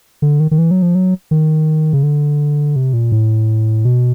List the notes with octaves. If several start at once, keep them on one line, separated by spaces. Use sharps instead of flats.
D3
D#3
D#3
E3
F#3
F3
F#3
D#3
C#3
D3
C3
A#2
A2
B2